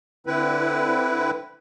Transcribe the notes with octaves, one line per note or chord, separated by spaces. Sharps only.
D3 C4 E4 B4